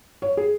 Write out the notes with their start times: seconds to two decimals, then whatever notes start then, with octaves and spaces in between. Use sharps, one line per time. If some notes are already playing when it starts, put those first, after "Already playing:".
0.22 C#5
0.37 G#4